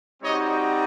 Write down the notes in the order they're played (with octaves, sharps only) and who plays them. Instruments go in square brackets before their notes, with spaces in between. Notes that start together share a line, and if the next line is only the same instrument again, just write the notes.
[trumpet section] G3 C4 D#4 F#4 C#5 D#5